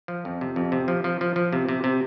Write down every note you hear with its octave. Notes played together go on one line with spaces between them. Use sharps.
F3
F2
C3
F2
C3
F3
F3
F3
F3
C3
C3
C3